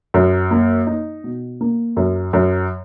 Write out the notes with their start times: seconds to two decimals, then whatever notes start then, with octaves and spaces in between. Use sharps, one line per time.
0.14 F#2
0.51 A#3
0.87 D#4
1.24 B2
1.61 A#3
1.97 F#2
2.33 F#2